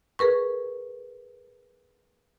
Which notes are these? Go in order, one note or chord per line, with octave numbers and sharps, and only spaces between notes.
G#4 A#4 B4 C#6